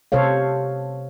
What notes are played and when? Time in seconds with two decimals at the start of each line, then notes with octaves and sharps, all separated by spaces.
0.12 C3 A4 C5 C#5 F5